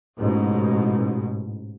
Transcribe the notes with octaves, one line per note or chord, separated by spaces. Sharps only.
A1 G#2 B2